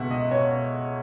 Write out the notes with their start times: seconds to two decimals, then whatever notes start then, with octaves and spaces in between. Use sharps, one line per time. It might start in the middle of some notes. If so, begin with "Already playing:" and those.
Already playing: C#2 B2 E5 F#5
0.11 D#5
0.31 B2 C#5